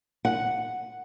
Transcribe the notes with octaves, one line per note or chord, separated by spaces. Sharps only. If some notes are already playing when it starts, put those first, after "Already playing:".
F#5